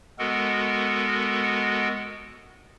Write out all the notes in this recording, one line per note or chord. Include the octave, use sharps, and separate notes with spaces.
G#3 B3 F#4 A4 A#4